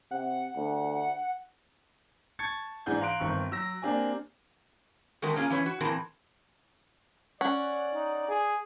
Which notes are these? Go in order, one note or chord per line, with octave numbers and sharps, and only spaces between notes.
C3 F#5
D2
A5 C#6 G#6 A6 C#7
G#2 E3 D4 G#4 F#5 G6
F5 A#5 C6 F#6 D7
G1 D#3 C4 C6 C#6
F#3 E6 A#6
A#3 C4 D4 G4 G#5
D#3 G#3 A3 C4 F#4 A#4
A#3 C#4 F4 G#4
E3 C#4 B4 C#5
F#4
A#2 E3 C4 G#4 A#4 A5
C#4 D5 F#5
D#4
G#4